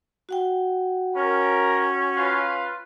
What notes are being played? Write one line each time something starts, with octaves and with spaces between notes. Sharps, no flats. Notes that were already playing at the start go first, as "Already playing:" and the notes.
F#4 F#5 G5
C#4 A#4
F4 B4 F5